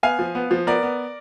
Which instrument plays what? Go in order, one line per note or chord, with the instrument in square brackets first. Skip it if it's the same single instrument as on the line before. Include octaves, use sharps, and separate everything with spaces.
[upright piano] B3 F5 G#5
F3
B3
F3
B3 A#4 D5
B3